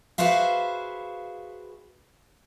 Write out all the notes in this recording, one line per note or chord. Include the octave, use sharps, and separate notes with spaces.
F#4 G#4 B4 C5 E5 F5